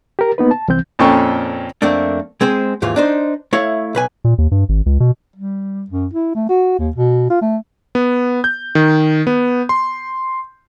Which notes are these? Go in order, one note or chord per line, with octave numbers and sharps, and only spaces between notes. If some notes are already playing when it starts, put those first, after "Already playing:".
G4 A#4
A#3 B3 D#4 B4
A5
C2 E3 C4 G6
F2 A#2 C#4 A4 G5 C#6
F2 A3 A#3 C4 D4
G#3 C4 G#4 C5
D#2 G#2 E3 F4
D4 D#4 C5
A3 E4 C#5 F5
B1 B4 G#5
A#2
D#2
G2
G#1
C#2
B2
G3
F#2
E4
A3
F#4
D#2
B2
F4
A3
B3
G6
D#3
B3
C6